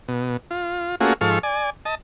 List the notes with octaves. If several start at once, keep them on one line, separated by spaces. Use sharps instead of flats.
B2
F4
A3 A#3 C#4 F4 F#4 G#4
G#2 F3 A4 C#6 F6
D5 G#5
D#5 A5